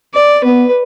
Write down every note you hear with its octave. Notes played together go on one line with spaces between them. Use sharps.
D5
B3 B4